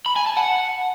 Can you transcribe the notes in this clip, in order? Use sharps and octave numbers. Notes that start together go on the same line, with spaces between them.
B5
G#5
A5
F#5